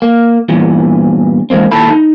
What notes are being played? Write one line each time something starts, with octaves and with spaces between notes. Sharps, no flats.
A#3
E2 G2 A#2 E3
E3 G#3 A#3 C4
D#2 A#2 E4 A4 B5
D#4